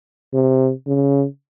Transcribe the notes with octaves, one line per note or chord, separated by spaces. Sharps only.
C3
C#3